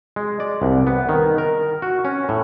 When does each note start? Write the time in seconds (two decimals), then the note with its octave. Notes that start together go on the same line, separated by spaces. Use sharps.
0.16 G#3
0.40 D5
0.62 C2
0.87 B3
1.09 D#3
1.38 A#4
1.82 F#4
2.05 C#4
2.29 A2